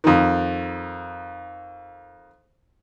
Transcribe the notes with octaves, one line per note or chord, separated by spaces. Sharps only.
F2 D#3